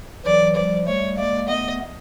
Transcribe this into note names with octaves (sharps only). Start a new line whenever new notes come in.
E3 F#3 D5
F3 G3 D5
G3 A3 C#5
G#3 A#3 D5
A3 B3 D#5